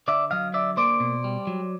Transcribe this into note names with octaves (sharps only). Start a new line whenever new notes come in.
D3 D5 E5
F#3 D#5 F5
D3 D5 E5
A#3 C5 D5
B2
G3
F#3